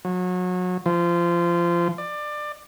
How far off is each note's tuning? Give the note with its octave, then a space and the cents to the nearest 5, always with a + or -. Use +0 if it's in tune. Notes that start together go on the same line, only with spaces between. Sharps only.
F#3 -30
F3 -20
D5 +20